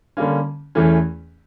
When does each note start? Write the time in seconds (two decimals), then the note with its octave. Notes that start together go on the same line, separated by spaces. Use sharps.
0.17 D3 G3 A#3 C#4
0.75 E2 E3 A3 C#4